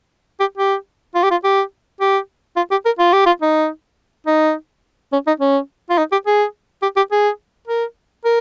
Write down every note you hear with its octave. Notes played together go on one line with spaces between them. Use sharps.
G4
G4
F4
G4
F4
G4
G4
F4
G4
A#4
F4
G4
F4
D#4
D#4
C#4
D#4
C#4
F4
D#4
G4
G#4
G4
G4
G#4
A#4
A#4